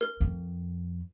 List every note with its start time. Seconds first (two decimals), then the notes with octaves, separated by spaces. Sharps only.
0.01 A#4
0.20 F2